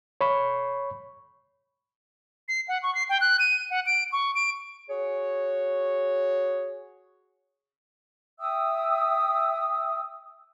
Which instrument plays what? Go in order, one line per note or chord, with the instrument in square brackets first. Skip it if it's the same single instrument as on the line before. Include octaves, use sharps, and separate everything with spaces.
[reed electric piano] C#5 B5 C#6
[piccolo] C7
F#5
C#6
C7
G5
F#6
D#7
F#5
D7
C#6
D7
[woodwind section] F#4 G#4 C#5
[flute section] E5 G5 D#6 E6